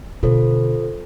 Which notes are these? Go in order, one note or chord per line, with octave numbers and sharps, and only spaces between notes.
B2 D3 F4 A4 C5